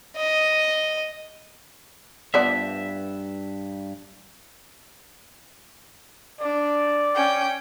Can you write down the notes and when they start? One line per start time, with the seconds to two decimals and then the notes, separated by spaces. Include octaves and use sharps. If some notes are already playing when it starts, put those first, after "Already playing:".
0.16 D#5
2.34 G2 F3 B3 D5 E5
6.41 D4 D5
7.15 C#4 G5